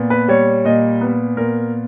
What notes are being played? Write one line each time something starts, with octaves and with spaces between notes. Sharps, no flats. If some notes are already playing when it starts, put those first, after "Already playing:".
Already playing: A#2 B3
B4
G3 C#5
A#2 D#5
B3
A#2 A#4